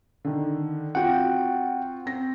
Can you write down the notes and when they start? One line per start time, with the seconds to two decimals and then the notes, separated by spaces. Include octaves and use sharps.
0.25 D3 D#3
0.95 C4 F4 F#4 F#5 G5
2.06 C4 A#6